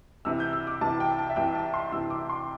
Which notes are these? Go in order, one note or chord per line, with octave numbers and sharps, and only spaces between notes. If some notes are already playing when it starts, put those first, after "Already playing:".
C2 C3 E3 E6
G6
E6
D6
C2 C3 E3 A5
G5
A5
E5
C2 C3 E3 G5
A5
C6
C2 C3 E3 E6
D6
C6